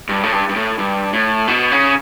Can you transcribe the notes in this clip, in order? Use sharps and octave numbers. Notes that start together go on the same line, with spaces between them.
G2
A2
G2
G2
A2
G2
A2
B2
C#3